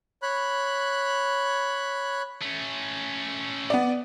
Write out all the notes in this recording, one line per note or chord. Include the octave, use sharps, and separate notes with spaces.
C#5 B5 F#6
A3 C#4
B3 D5